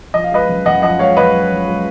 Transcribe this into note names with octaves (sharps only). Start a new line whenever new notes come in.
F3 D#5
F5
G#3 B4 D#5
F#2
F#2 D#5 F#5
F3 D#5 F#5
G#3 C#5 F5
F#2 B4 D#5
F#2
F3
G#3